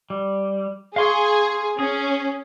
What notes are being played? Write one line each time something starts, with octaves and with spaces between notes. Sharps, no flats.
G3
G#4 F5 C6 C#6
C#4 G#4